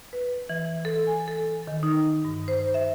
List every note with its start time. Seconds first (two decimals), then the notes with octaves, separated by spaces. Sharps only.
0.13 B4
0.49 E3
0.85 A4
1.07 G#5
1.28 A4
1.67 D#3
1.83 D#4
2.25 G2
2.48 C5
2.74 E5